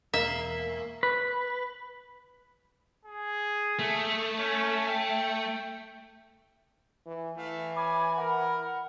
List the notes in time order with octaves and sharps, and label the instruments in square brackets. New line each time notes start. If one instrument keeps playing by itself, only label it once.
[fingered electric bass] E1 [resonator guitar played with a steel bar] A#3 [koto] E5
[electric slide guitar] B4
[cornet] G#4
[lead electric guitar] A3
[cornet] C#4
G5
[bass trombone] E3
[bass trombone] E3 [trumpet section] A3 E5 F5
[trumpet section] C#5 G#5 [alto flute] B5 [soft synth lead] D6
[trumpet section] A#4 [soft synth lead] F#5